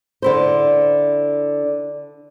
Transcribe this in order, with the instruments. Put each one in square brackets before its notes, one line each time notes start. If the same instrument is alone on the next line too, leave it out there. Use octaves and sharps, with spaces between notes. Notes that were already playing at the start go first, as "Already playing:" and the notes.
[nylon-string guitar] D3 E4 C5